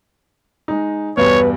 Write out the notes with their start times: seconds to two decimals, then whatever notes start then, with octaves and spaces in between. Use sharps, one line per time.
0.68 G#3 D#4
1.17 E2 G2 B2 B4 C#5